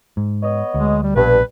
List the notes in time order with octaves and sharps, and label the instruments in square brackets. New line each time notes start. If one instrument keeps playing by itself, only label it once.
[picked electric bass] G#2
[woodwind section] B3 C#5 D#5
[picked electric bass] D2 [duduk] G#3
[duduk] G3
[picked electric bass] A#1 B2 [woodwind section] G2 [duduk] B4